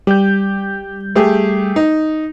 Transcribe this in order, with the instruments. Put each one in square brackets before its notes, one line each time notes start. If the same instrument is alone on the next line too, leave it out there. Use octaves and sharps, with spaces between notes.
[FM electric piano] G3 G6 [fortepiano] G4
[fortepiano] A3 G4 G#4
D#4